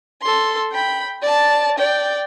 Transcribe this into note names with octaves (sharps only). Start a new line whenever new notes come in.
A4 C6
G5 B5
D5 A5
D5 G5